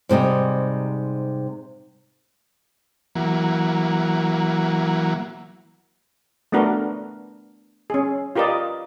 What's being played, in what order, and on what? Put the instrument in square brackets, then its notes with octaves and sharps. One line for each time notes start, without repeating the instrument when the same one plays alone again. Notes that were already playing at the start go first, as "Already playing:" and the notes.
[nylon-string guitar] G#2 C3 G3 D#5
[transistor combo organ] E3 F#3 A#3
[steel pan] A3 B3 D4 F#4 A#4 B4
C#4 G#4
F4 G4 A#4 B4 D5 D#5